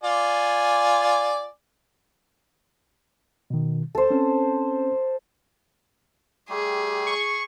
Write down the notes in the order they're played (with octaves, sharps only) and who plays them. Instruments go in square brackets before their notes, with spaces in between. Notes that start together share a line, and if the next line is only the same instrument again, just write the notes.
[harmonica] F4 D5 G#5
[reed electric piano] B2 D#3
[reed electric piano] D2 [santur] A4 C5
[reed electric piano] C4 C#4
[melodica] G3 A3 G4 [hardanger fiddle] G#4
[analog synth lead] C#6